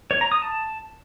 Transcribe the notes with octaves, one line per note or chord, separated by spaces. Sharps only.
C#5
A#5
D#6
A5